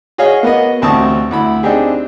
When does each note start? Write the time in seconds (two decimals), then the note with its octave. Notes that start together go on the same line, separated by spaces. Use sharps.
0.18 F#4 G#4 C#5 D#5 F5
0.43 A#3 B3 F#4 D#5
0.82 A1 D2 C4 A5 C#6 D#6
1.31 D2 E4 B5
1.63 C4 D4 D#4 G4 G#4